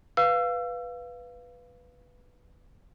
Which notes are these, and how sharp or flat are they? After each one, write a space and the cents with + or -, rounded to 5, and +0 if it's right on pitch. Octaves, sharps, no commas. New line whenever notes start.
B4 +0 F5 +0 E6 +30